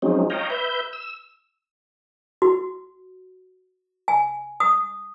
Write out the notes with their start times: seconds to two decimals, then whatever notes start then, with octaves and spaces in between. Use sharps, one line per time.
0.02 F3 F#3 G#3 C4 C#4 D#4
0.30 C#5 D#5 F5 G5 A#5
0.50 B4 E5 G6
0.93 E6
2.42 F#4
4.08 G#5
4.60 D#6